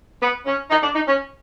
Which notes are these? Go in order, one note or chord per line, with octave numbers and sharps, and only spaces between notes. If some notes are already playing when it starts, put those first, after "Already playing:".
B3
C#4
D#4
D4
D#4
C#4